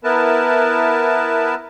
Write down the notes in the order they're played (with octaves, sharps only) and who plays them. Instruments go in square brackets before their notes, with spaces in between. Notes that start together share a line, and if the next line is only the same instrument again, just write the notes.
[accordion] B3 E4 A#4 B4 A5